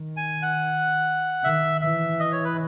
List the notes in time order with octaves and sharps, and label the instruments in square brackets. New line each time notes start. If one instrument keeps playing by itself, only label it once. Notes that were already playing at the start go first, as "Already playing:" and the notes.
Already playing: [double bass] D#3
[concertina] G#5
F#5
[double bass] D#3 [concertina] E5
[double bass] E3 [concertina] E5
[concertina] D#5
C#5
B4